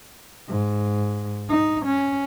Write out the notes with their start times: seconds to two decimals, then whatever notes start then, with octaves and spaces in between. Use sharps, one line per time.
0.48 G#2
1.49 D#4
1.86 C#4